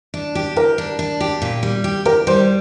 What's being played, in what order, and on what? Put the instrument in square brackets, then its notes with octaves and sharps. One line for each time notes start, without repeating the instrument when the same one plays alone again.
[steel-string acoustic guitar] D4
G4
[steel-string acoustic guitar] G4 [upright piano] A#4
[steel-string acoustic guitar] D4
D4
G4
A#2
G3
G4
[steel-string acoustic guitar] G4 [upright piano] A#4
[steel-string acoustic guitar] G3 [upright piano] C5